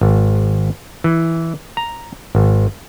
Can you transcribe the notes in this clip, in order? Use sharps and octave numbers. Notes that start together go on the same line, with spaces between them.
G#1
E3
A#5
G#1